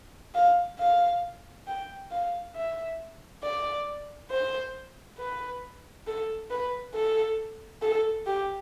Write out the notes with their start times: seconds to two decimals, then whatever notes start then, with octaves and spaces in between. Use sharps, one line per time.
0.35 F5
0.79 F5
1.67 G5
2.11 F5
2.55 E5
3.43 D5
4.31 C5
5.19 B4
6.07 A4
6.50 B4
6.95 A4
7.82 A4
8.27 G4